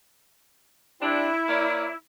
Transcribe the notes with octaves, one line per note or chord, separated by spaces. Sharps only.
G3 C4 D4 E4
A#3 C#5 D5